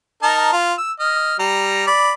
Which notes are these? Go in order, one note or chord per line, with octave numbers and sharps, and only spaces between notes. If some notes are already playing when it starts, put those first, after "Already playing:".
D#4 A#4 A5
F4
E6
D#5 F6
G3 A#5
D5 B5